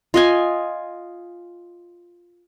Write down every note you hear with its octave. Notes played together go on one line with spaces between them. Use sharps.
F4 D#5 G#5